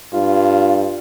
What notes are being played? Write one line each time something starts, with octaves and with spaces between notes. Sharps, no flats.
G2 F4